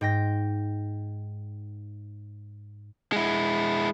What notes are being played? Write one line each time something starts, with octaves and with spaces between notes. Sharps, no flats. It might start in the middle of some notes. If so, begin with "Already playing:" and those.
G#2 G5 A#6
G#3 E4